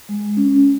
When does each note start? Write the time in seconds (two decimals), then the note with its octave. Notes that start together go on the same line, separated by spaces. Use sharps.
0.09 G#3
0.37 C#4